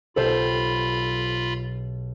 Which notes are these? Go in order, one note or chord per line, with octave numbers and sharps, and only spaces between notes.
B1 B2 F4 G4 A4 C5 B5